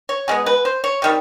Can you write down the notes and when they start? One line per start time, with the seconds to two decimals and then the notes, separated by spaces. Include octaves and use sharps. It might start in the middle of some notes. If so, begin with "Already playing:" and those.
0.09 C#5
0.28 B2 G#3 B3 G#4
0.46 B4
0.65 C5
0.84 C#5
1.02 C3 D#3 G3